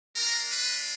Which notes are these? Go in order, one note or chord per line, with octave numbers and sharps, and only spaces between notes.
G#3 D4 F4 A#4
B4